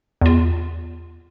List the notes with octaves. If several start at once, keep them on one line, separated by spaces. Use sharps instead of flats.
E2 F4